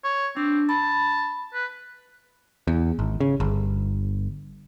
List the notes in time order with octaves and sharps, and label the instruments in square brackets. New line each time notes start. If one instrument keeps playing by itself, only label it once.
[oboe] C#5
[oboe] C4 [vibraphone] D4
[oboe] A5 [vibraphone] B5
[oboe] B4
[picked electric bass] E2
G#1
C#3
G1